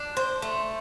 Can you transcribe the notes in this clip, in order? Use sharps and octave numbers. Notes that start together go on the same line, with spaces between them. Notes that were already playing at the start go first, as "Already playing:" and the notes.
Already playing: D4
C5
A3